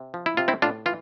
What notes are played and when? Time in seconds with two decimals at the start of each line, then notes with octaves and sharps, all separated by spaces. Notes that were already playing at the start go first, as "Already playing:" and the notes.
Already playing: C3
0.14 F3
0.26 E4
0.37 C3 F4
0.48 C4 E4
0.62 A2 D4 F4
0.86 E3 F4